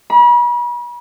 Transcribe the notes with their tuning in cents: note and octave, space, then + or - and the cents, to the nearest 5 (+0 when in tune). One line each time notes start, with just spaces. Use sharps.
B5 -40